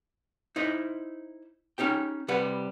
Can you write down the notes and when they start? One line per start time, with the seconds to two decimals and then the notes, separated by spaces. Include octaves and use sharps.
0.56 D#4 E4 C5 D#5
1.78 C#4 D#4 G4 G5
2.28 C3 G3 B4 F#5